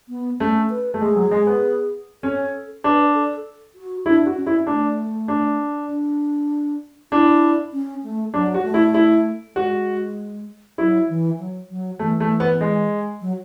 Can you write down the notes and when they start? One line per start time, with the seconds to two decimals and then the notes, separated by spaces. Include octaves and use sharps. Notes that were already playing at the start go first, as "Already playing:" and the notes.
0.09 B3
0.40 A3 C#4
0.70 B4
0.94 A3
1.01 G#3 G#4
1.16 F#3
1.31 G#3
1.47 B3
2.23 C#4 A4
2.84 D4 B4
3.14 A4
3.75 F#4
4.06 D4 E4
4.26 F#4
4.36 C#4
4.47 E4
4.67 A3 D4
5.28 D4
5.89 D4
7.12 D4 E4
7.73 C#4
8.04 A3
8.34 F#3 D4
8.54 F#4
8.60 G#3
8.63 A3
8.74 E4
8.94 E4
9.55 G#3 F#4
10.78 F#3 E4
11.09 E3
11.39 F#3
11.70 F#3
11.99 E3 A3
12.20 A3
12.40 B3
12.61 G#3
13.21 F#3